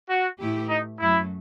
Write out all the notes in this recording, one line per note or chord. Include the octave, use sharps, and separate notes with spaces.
F#4
A2 E3 A3 E4 G4
D#4
F#2 F#3 A3 E4